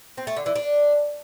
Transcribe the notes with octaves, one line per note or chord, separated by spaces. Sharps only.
C4
A3
D3
E3
D4